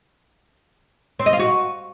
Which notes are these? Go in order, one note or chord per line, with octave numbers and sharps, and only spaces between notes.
C4
D#5
F4
F#4